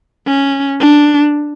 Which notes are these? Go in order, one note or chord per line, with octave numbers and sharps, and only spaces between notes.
C#4
D4